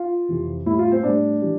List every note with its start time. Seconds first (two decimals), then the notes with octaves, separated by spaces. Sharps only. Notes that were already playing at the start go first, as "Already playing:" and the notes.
Already playing: F4
0.29 F2 C3 E3
0.66 A2 G3 E4
0.79 F4
0.91 C4 C5
1.03 A2 G3 D4 D5
1.41 E3 G3